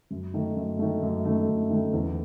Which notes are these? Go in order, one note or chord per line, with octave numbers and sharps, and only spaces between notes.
F#2
D#3 A3
F#2
D#3 A3
F#2
D#3 A3
F#2
D#3 A3
E2